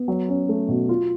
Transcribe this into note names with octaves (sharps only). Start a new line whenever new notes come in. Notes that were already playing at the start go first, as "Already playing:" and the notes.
Already playing: B3
F#3
C#4
A3
B2
F4